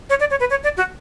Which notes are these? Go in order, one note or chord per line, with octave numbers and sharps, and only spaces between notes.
C#5
D5
C#5
B4
C#5
D5
F#4